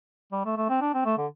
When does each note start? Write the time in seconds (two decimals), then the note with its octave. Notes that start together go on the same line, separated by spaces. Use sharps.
0.32 G3
0.45 A3
0.57 A3
0.69 C4
0.82 D4
0.94 C4
1.06 A3
1.18 D3